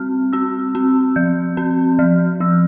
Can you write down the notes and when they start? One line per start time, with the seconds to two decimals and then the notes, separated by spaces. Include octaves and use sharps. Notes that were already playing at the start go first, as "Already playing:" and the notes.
Already playing: G3 C4 F6
0.33 C4 E6
0.75 C4
1.16 F3 G6
1.57 C4
1.99 F3 F6
2.40 F3 E6